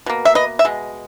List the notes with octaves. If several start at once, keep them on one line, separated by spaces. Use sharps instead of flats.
B2 A#3
E5
B4 D#5
E5
B2 G#3